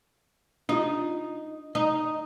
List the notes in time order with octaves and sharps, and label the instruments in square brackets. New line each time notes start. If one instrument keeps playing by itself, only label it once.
[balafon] D4 F4 [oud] D#4
[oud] D#4